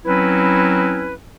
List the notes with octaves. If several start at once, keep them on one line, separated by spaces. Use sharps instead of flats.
F#3 C4 C#4 E4 B4